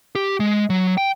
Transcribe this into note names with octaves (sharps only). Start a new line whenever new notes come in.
G4
G#3
F#3
G5